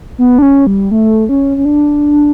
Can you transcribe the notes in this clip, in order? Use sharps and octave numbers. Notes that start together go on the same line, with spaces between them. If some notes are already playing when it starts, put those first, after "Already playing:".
B3
D4
C#4
G3
A3
C#4
C#4
D4